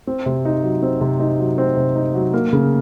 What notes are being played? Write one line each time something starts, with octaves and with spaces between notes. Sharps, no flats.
C4
C3
D#4
F#3
C4
C3
D#4
F#3
C4
C3
D#4
F#3
A#3
C#3